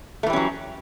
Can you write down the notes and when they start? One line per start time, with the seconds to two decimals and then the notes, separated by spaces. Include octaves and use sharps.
0.23 A3
0.26 E3
0.30 G3
0.33 C#4
0.36 F#3